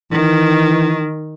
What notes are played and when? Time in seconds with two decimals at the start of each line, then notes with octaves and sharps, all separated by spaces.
0.12 D#3 E3